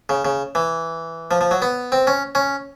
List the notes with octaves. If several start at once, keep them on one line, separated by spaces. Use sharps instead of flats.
C#3
C#3
E3
F3
F3
F#3
B3
C4
C#4
C#4